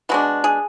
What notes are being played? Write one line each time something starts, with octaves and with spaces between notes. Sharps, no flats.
B2 G#3 D4 F#4
G#4